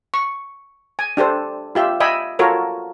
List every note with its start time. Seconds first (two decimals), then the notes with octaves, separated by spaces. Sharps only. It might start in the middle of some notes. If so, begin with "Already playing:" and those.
0.14 C#6
0.99 G#5
1.17 D4 G4 A4 C5
1.75 F4 G4 E5
2.00 D#5 E5 G5 G#5 B5
2.39 F4 F#4 A4 A#4 C#5